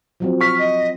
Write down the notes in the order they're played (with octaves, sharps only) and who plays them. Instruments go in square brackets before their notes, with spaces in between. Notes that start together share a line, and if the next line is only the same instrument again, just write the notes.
[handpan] F3 F#3 C4
[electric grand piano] C#6 B6 [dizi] F6
[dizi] D#5